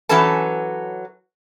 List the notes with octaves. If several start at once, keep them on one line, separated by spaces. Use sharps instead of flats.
E3 F#3 C#4 A4 B4 A5